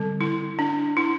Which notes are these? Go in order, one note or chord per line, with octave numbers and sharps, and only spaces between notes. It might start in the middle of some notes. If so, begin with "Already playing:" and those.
Already playing: D3 G3 C4
E4
D4
E4